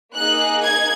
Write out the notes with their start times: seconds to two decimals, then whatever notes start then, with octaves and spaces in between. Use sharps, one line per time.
0.15 A#3 D#4 G#4 F#6
0.64 G#6